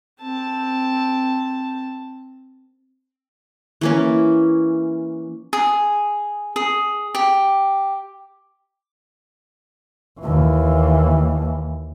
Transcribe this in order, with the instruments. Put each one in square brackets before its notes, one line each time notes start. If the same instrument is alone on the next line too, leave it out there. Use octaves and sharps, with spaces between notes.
[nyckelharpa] C4 A5
[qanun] E3 A#3 C#4
[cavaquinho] G#4
G#4
G4
[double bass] D#2 E3